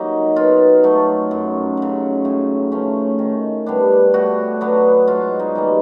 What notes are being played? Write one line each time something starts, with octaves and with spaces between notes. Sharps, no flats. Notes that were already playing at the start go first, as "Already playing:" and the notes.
Already playing: F#3 A#3 D#4
B2 F4
F#3 A3
F#2
C#3 F#3
A2
F3 A3 C#4
D#3
G3 B3 D4
A2 F#4
F#3 B3 D4
G#2 F4
D#4
E3 G3 A#3